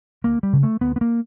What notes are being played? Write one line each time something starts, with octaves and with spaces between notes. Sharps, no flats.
D2 A#3
G3
C#3
A3
D2 B3
B3
A#3